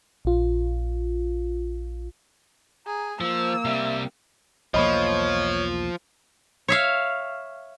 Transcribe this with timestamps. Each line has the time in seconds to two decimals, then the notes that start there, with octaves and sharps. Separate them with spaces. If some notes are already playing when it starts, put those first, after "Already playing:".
0.25 A#1 F4
2.86 G#4 A#5
3.21 F3 A#3 C5 E6
3.65 C3 G3 E5
4.74 B1 E2 F3 A#3 C#5 D#5 B5
6.68 C#5 E5 F5